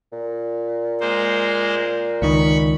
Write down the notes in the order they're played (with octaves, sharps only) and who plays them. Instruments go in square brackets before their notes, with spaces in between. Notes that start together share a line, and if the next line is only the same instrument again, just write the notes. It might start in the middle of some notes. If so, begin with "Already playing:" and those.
[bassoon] A#2
[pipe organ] G#3 A#3 C5
[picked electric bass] C#2 D#3 [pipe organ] B5 C#6